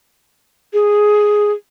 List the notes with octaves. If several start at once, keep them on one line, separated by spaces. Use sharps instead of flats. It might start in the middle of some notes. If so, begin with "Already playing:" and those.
G#4